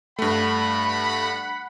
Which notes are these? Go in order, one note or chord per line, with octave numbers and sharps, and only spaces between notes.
G2 A3 F#5 B5